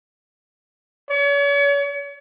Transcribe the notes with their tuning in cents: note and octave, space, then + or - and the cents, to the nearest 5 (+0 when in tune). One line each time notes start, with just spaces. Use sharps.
C#5 +40